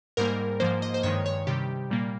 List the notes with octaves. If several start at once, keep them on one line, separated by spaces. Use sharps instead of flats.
G#2 G3 A#3 A#4
G#2 F3 A#3 C5
D#5
C5
G2 D#3 G#3 C#5
C#5
C3 D#3 G3 G4
A#2 G3 A#3